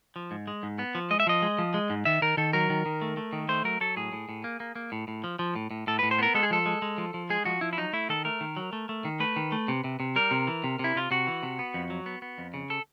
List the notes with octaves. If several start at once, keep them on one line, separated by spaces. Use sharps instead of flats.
F3
G#2
G#3
G#2
B3
F3
G#3 D#5
E5
F3 D#5
G#3
F3
G#3
G#2
D#3 E5
D#3 A#4
D#3 A4
F#3 A#4
D#3
D#3
A3
A3
D#3
A3 C5
F#3 A#4
F#3 A4
A2 G#4
A2
A2
A#3
A#3
A#3
A2
A2
F3
F3
A2
A2
A2 A4
A2 B4
C5
B3 A#4
G#3 A4
G#4
F3 A4
G#3
G#3
F3
F3
G#3 G#4
F3 F#4
F3 E4
E4
F#3 D#4
A3 E4
D#3 A4
A3 A#4
D#3
F#3
A3
A3
D#3
A3 B4
D#3
A3
C3
C3
C3
G3 A#4
C3
E3
C3
C3 E4
C3 F4
C3 F#4
E3
C3
B3
F2
F#3
B3
B3
F2
C#3
A4